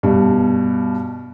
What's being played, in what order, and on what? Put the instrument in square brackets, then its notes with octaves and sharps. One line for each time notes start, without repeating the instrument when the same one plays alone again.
[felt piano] G2 B2